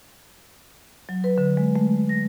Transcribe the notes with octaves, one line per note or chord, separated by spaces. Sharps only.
F#3
B4
D3
G#3
A3
A#6